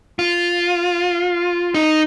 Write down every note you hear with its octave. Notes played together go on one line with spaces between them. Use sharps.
F4
D#4